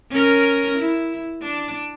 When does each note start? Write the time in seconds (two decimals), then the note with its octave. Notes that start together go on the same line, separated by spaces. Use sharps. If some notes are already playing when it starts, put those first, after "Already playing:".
0.11 C#4 A#4
0.79 E4
1.42 D4